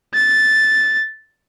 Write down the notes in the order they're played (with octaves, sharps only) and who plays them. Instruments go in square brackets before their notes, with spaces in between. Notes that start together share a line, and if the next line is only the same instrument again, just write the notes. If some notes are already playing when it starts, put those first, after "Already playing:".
[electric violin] A6